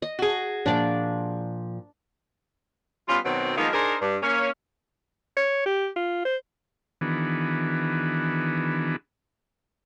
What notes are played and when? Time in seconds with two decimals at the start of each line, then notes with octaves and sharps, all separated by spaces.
0.02 D#5
0.19 F#4 G#4
0.66 A#2 F3 D4 D5 G5
3.08 G3 B3 C#4 F4
3.25 B2 D#3 F#3 C4
3.57 D#3 F3 G#3 A#3 B3 D#4
3.73 D4 D#4 G#4 A#4 C5
4.01 G2
4.22 A#3 C#4
5.36 C#5
5.66 G4
5.96 F4
6.25 C5
7.01 D#3 E3 B3 D4 F#4 G#4